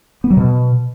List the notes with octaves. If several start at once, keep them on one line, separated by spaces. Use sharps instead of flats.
B3
F#3
B2